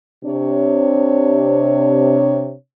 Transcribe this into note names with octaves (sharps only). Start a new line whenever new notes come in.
C3 D4 C#5